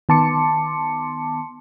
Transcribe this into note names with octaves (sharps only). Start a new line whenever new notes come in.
D#3 B3 A5 C6 D6 C#7